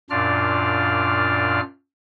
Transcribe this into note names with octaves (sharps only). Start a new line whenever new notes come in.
F#2 A#2 D4 F4 D5 F6